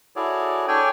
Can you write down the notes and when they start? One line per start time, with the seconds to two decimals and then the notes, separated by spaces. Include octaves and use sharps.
0.16 E4 F#4 G#4 A4 C#5 D5
0.68 D4 A4 C#5 D5 G5 G#5